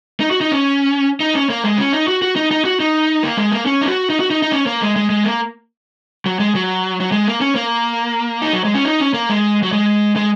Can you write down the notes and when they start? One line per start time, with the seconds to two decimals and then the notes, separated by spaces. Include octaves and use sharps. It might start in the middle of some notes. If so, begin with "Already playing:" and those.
0.20 D#4
0.31 F#4
0.41 D#4
0.52 C#4
1.20 D#4
1.35 C#4
1.50 A#3
1.64 G#3
1.78 C#4
1.93 D#4
2.08 F#4
2.22 F#4
2.36 D#4
2.51 D#4
2.65 F#4
2.80 D#4
3.23 A#3
3.37 G#3
3.51 A#3
3.66 C#4
3.81 D#4
3.88 F#4
4.10 D#4
4.20 F#4
4.31 D#4
4.42 D#4
4.52 C#4
4.66 A#3
4.82 G#3
4.96 G#3
5.10 G#3
5.25 A#3
6.26 F#3
6.40 G#3
6.55 F#3
7.01 F#3
7.12 G#3
7.27 A#3
7.41 C#4
7.56 A#3
8.42 D#4
8.53 F#3
8.65 G#3
8.74 C#4
8.85 D#4
9.00 C#4
9.14 A#3
9.29 G#3
9.62 F#3
9.72 G#3
10.16 G#3